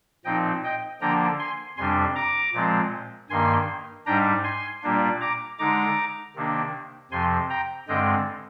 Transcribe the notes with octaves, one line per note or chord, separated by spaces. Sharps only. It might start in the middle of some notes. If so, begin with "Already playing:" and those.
A#2 F3 C4 D#4 D#5 G5
D#5 G5
D3 F3 A#3 D4 G5 A#5
G#5 C6
F2 C3 G3 D4 G#5 C6
A#5 D6
A#2 F3 G#3 C4
G2 D#3 A#3 G#5 C6
G#2 G3 D4 G5 A#5
G#5 C6
A#2 G3 A#3 D4
A#5 D6
D3 G#3 D#4 A#5 D6
C3 D#3 A#3 D4
F2 C3 F3 G#5 C6
G5 A#5
G2 D3 G#3 C4 D#5 G5